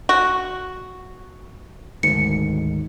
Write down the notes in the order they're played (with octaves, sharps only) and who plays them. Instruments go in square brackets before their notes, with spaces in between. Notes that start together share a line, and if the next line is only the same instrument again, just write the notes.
[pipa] F#4 [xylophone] C#6
[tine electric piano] D2 G#2 D#3 [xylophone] C#7